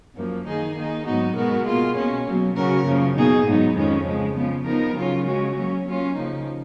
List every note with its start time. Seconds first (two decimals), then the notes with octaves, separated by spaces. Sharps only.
0.16 F#2 F3 A#3
0.46 D#3 A#3 D#4 G#4
0.75 D#3 A#3 D#4
1.06 G#2 F#3 B3 D#4 F#4
1.36 B2 G#3 B3 F#4 A#4
1.66 B2 A#3 F4 G#4
1.96 B2 A#3 C#4
2.25 B2 F#3 A#3
2.56 C#3 F#3 C#4 F#4 A#4
2.86 F#2 C#3 F3 A#3
3.15 B2 A#3 D#4 G#4
3.45 G#2 F#3 B3 D#4
3.75 F2 D#3 G#3 C#4
4.06 C#3 F3 G#3
4.35 C#3 F3 B3
4.65 F3 B3 D#4 A#4
4.96 C#3 F#3 C#4 F4
5.24 C#3 G#3 C#4 F#4
5.55 F#3 A#3 C#4
5.85 F#3 A#3 C#4 F4
6.14 C#3 F3 A#3 D#4